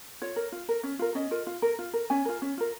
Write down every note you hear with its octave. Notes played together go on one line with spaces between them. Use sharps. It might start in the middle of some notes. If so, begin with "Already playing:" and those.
F4 C#5
A#4
F4
A#4
C#4
F4 A#4
C#4 D#5
F4 A#4
F4
A#4
F4
A#4
C#4 G#5
F4 A#4
C#4
F4 A#4